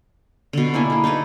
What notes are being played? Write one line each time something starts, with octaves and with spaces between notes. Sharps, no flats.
B2 D3
A#3 D4 E4 G#5
A#3 G#4
D#4 E4 A4 B4